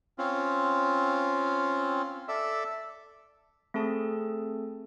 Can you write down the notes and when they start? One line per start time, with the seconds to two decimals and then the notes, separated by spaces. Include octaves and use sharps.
0.18 C4 C#4 F4
2.28 A4 D5 E5
3.74 A3 C4 G#4 A4 A5